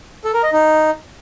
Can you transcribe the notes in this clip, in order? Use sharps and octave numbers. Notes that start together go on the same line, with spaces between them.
A4
A#4
D#5
D#4